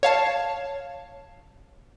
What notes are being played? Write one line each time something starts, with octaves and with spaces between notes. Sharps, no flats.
C#5 F5 A5